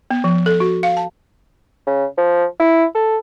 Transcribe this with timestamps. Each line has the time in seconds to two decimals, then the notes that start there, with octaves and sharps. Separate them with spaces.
0.11 B3
0.24 F3
0.46 A4
0.60 F#4
0.83 F5
0.97 A5
1.87 C#3
2.18 F3
2.60 E4
2.95 A4